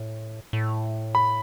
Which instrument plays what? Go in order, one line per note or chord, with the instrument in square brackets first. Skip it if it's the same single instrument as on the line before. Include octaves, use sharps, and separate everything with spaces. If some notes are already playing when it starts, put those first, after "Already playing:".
Already playing: [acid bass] A2
A2
[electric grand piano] B5